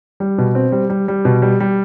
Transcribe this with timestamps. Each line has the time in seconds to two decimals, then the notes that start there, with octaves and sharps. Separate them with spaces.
0.20 G3
0.38 B2
0.55 C4
0.72 G3
0.89 G3
1.08 G3
1.25 B2
1.42 G3
1.60 G3